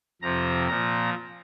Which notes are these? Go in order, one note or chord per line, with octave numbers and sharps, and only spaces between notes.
F2 C3 F3 A#5
A#2 F3 A#5